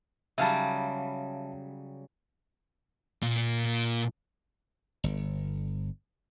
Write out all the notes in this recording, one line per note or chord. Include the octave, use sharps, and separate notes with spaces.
C#3 F#3 G3 E5 F5 A5
A#2
G1